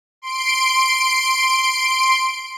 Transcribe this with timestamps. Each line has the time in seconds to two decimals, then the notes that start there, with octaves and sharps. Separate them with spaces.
0.22 C6 D7